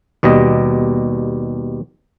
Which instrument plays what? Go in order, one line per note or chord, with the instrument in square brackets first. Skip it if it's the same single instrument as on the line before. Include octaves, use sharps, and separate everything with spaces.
[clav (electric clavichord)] D#2 B2 G3 D#5